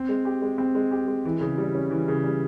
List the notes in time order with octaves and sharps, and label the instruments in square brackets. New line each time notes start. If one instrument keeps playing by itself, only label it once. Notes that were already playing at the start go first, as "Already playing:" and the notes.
Already playing: [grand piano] C4
G#3
G4
G#3
C4
G#3
G4
G#3
E3
C#3
G3
C#4
E3
C#3
G3